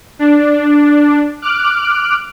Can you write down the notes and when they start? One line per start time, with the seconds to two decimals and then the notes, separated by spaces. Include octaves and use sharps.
0.19 D4
1.42 D6 F6 F#6 D7